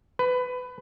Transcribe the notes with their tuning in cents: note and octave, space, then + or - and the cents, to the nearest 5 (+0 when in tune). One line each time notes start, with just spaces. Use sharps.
B4 +20